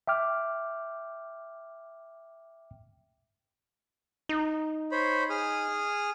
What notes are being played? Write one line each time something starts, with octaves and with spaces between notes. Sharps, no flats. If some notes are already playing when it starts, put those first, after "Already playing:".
E5 G5 D6 F6
D#4
C5 C#5 B5
G#4 D#6 F6